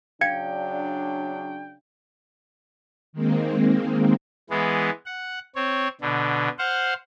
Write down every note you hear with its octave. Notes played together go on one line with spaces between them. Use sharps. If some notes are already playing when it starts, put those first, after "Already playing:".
C#3 F#3 D4 F5 G5 G#6 C#7
D#3 G#3 A#3 C4
E3 G#3 B3
F#5
C4 C#5
B2 D3
C5 F5 F#5